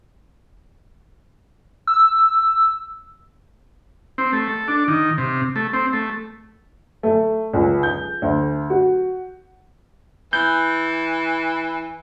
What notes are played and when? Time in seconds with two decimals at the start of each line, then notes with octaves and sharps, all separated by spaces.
1.87 E6
4.18 C4
4.33 A3
4.48 A4
4.68 D4
4.88 D#3
5.18 C3
5.56 A3
5.73 C4
5.93 A3
7.03 A3
7.54 C#2
7.83 G6
8.22 D2
8.70 F#4
10.33 E3 G6